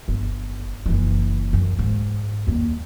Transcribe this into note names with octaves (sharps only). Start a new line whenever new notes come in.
G1
F#1 E3
F#2
G#2
D#2 G3